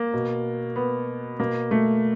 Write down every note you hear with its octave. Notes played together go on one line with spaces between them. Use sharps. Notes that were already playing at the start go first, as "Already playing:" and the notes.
Already playing: A#3
B2
B3
B2 A#3
A3